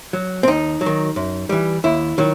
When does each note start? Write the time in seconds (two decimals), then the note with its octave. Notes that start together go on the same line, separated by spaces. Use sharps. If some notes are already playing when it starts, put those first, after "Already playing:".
0.13 F#3
0.43 C4
0.47 D#2 D#4
0.81 F#3
0.86 D#3
1.16 F#2
1.49 E3 G3
1.84 D#2 E4
2.18 D#3 F#3